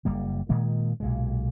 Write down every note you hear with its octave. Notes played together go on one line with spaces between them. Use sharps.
F#1 G3 A#3
A#2 D#3 G#3 A#3
B1 A#2 G#3